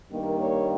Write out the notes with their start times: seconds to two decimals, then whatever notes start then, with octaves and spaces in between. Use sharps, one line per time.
0.12 G2 D#3 G3 A#3
0.40 C#5